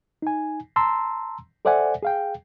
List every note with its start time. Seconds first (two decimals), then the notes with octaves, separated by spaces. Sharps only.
0.22 D#4 G#5
0.76 A5 A#5 C6 E6
1.65 A4 C5 D5 E5 F#5 G#5
2.03 G#4 F5 G5